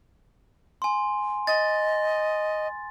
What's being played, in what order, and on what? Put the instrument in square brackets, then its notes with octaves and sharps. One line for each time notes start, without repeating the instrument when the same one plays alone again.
[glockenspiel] G#5 C6
[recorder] D#5 [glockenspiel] A6